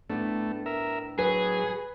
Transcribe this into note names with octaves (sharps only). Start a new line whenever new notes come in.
A2 A3 B3 D4
A#4 E5
F#3 G#4 B4